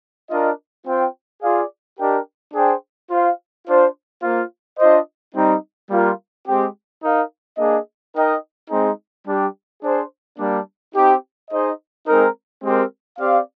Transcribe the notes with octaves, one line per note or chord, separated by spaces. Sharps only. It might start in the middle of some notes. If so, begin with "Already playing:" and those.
D4 F4 A#4 D#5
C4 F4 C5 G5
F4 G#4 D5 F5
D4 G4 A#4 D#5 G5
D4 G#4 C5 G5
F4 C5 F5
D4 F4 C5
A#3 F4 C5 F5
D4 F4 C5 D#5
G3 C4 D#4
G3 A#3 F4 A#4
G#3 C4 G4
D#4 A#4 F5
A#3 D4 G#4 D#5
D#4 A#4 D#5 G5
G#3 C4 D#4 G#4
G3 D4 G4
D4 G#4 C5
G3 A#3 D4
C4 D#4 G4
D#4 G#4 C5 D#5
G#3 C4 D#4 A#4
G#3 C4 G4 A#4
C4 G4 D5 F5